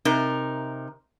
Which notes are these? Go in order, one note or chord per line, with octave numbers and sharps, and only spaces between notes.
C3 D#4 A#4